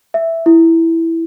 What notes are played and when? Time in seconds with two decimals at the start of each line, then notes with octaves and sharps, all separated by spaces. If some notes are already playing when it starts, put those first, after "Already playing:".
0.14 E5
0.46 E4